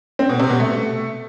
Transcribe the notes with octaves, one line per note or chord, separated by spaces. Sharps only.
C4
B2
C3
B2
A3